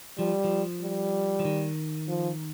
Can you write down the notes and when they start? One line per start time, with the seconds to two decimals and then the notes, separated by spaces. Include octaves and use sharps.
0.18 F3 G3
0.44 F3
0.82 G3
1.40 F3
1.45 D#3
2.08 F3